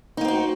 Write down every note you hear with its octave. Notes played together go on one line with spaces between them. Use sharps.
A#3 C4 D#4 F#4